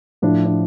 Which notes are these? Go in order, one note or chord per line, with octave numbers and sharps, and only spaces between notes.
A2 F3 D4
D4